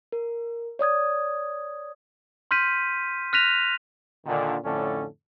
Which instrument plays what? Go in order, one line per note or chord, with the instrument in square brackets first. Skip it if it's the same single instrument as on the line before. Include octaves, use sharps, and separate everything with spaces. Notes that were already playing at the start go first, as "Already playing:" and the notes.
[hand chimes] A#4
C#5 D5 D#6 G#6
[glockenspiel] C6 F6 G6 B6 D#7
F6 F#6 A#6 B6 D#7 F7
[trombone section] A#2 D3 D#3
F2 A2 D3 C#4 D4 A4